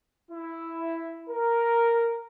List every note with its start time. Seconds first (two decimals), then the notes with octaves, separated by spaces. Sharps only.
0.31 E4
1.29 A#4